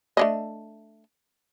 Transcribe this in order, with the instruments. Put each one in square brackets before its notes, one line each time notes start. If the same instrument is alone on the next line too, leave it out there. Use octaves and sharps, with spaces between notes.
[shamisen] A3 D4 D#5